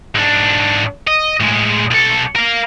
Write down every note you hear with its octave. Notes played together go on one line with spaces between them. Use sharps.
G#2 D4
D#5
A2 G#3
B1 A4
A#4 F5